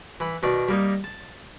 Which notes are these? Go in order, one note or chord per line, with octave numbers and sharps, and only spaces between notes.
E3 B5
B2 D#3 D5
G3 A#3 D#4
A5